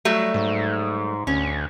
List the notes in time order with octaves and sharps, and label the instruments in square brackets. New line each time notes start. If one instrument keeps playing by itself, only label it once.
[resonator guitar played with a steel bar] F#3 G3 A3
[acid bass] G#2
[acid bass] D2 [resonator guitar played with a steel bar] C#4